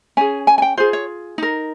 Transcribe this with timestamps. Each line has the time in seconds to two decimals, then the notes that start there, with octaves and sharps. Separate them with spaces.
0.17 C#4 G#4 G#5
0.47 G#5
0.58 G#5
0.62 G5
0.77 F4 G#4 C5
0.93 C#5
1.38 D#4 A#4